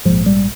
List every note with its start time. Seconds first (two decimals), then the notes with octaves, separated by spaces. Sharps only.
0.05 A#1 G#2 F3
0.26 G3